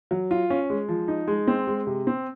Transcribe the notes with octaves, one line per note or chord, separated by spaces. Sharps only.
F#3
F4
C#4
G#3
F3
D#4
G#3
C4
G#3
C3
C4